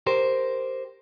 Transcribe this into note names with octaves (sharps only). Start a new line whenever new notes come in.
G4 A#4 C5